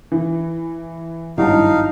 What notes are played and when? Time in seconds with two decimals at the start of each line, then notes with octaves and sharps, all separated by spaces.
0.12 E3
1.38 G#1 G2 F#3 D#4 E4 F5 A5